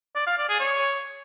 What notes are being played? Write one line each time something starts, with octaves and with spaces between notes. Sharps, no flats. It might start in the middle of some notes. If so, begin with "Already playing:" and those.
D5
F5
D5
G#4
C#5